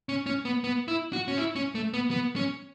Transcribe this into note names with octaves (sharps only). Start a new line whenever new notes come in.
C#4
C#4
B3
B3
E4
F#4
C#4
E4
C#4
A3
B3
B3
C#4